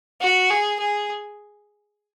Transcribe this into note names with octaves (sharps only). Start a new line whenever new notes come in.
F#4
G#4
G#4